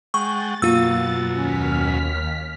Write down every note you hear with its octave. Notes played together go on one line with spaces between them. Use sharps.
G#3 F#5 G5 C#6 A6
F#2 B2 F#3 A#3 F4 E6
D#2 C#4 F6 B6